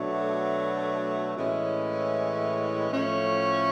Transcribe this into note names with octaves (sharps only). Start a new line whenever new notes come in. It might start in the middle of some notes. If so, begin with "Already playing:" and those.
Already playing: B2 F#3 A3 D4
A2 E3 G#3 C#4 E4
A2 F3 A3 C#4